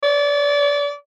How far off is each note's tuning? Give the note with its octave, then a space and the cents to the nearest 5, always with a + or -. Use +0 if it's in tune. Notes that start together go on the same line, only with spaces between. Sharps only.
D5 -30